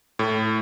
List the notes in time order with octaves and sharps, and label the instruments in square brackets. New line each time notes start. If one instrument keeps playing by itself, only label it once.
[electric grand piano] A2